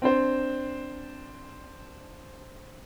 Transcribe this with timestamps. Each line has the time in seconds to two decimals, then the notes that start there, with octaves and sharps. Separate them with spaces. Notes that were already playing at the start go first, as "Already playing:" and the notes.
0.02 C4 D4 C5